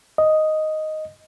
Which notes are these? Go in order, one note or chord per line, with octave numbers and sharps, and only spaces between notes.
D#5